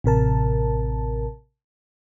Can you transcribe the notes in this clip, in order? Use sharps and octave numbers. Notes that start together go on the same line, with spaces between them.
A1 C3 A#4 A5